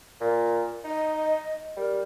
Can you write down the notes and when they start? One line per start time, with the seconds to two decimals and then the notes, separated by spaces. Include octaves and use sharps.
0.21 A#2
0.84 D#4 D#5
1.77 G3 A#4